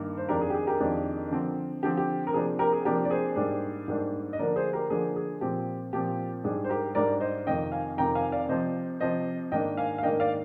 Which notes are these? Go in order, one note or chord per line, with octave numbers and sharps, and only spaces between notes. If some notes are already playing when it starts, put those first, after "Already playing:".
Already playing: G2 D#3 A#3
C5
F2 D#3 G#3 D4 G4 A#4
G#4
G4
G#4
G4 A#4
F2 D#3 G#3 D4
D3 F3 C4
D3 F3 C4 G4
G4
A#4
C3 F3 A#3 D4 G#4
G4 A#4
G#4
C3 F3 A#3 D4 G4 A#4
D5
G#4 C5
G#2 G3 A#3 D4
G#2 G3 A#3 D4
D#5
D3 F3 A#3 D4 A#4 D5
G#4 C5
G4 A#4
D3 F3 A#3 D4 G#4
G#4
A#2 F3 C4 G4
A#2 F3 C4 G4
G#2 G3 D4 G#4
C5
G4 A#4
G#2 G3 D4 A#4 D5
C5 D#5
F2 C3 D#3 D#5 G5
F5 G#5
F2 C3 D#3 G5 A#5
F5 G#5
D5 F5
C3 F3 C4 C5 D#5
C3 F3 C4 C5 D#5
G#2 D#3 A#3 D4 D#5 G5
F5 G#5
F5
G#2 D#3 A#3 D4 D#5 G5
D5 F5